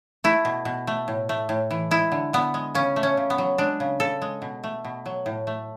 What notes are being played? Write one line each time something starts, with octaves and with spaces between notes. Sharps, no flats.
A3 E4
B2
B2
A3
A2
A3
A2
E3
G#3 E4
D3
D3 B3
G#3
C#3 C#4
A3
C#4
C#3
B3
F#3
G#3 D4
C#3
C#3 A4
G#3
B2
A3
B2
F#3
A2
A3